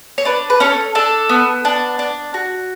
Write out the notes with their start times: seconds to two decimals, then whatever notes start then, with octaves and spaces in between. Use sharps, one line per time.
0.18 C#5
0.25 D4 B4
0.50 B4
0.60 C#4 A4 C#5
0.95 D4 A4
1.29 B3
1.65 D4
1.99 D4
2.34 F#4